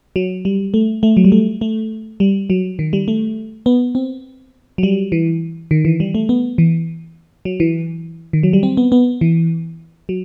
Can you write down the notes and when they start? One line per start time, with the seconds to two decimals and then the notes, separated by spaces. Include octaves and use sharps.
0.16 F#3
0.45 G3
0.74 A3
1.03 A3
1.17 F#3
1.24 G3
1.32 A3
1.61 A3
2.20 G3
2.50 F#3
2.79 D#3
2.93 G3
3.08 A3
3.66 B3
3.95 C4
4.78 F#3
4.83 G3
5.12 E3
5.71 D#3
5.85 E3
6.00 G3
6.14 A3
6.29 B3
6.58 E3
7.45 F#3
7.60 E3
8.33 D#3
8.43 F#3
8.53 G3
8.63 C4
8.77 B3
8.92 B3
9.21 E3
10.09 F#3